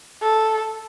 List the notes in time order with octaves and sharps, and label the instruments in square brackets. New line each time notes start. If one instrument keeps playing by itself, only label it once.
[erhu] A4